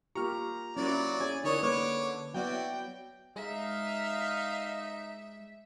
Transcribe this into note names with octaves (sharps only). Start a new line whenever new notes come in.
A#3 F4 G4 A#5 C#6 F6
F#3 A#3 C#4 E4 D5
C#4 G#4 C#5 G#5
D3 E3 D#4 A#4 C#5 D5 D#6
A#3 B4 C#5 D6
F#3 B3 E4 F#4 D5 G5
G#3 D#4 E5 F5